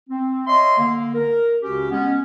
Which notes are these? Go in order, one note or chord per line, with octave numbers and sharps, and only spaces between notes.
C4
C#5 D#5 E5 C6
D3 A#3
A#4
C#2 C#3 C#4 F#4 G4
G#3 B3 C#4